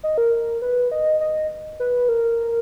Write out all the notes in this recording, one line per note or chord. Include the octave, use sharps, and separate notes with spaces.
D#5
A#4
B4
D#5
D#5
B4
A#4